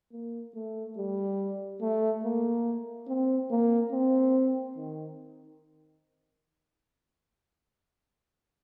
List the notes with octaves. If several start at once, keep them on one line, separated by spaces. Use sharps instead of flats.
A#3
A3
G3
A3
A#3
C4
A#3
C4
D#3